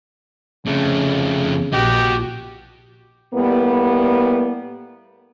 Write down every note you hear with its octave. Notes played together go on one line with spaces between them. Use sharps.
F2 C#3 A3
A#1 F#4 G4 D#5
A2 G3 A#3 B3